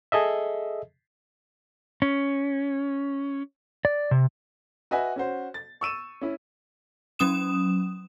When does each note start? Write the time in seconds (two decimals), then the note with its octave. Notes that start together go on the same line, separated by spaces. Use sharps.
0.12 G#4 A4 D#5 E5
2.02 C#4
3.85 D5
4.11 C3
4.91 F#4 B4 D#5 E5 G#5
5.16 C#4 F#4 C5
5.54 A6
5.81 C#6 E6 D#7 E7
6.21 C#4 E4
7.19 F#3 C#4 D#6 E7